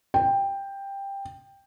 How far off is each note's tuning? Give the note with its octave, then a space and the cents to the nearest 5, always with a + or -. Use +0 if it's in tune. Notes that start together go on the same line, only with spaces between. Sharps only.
G5 +10